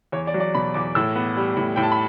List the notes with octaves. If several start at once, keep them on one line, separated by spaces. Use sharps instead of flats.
E2 C#5
D5
F#3
D5
B2 B5
E2 D6
A2 E6
B3
G3
A2
A2 G5
A5
B5